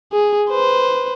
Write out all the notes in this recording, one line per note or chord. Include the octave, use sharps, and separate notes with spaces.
G#4
B4 C5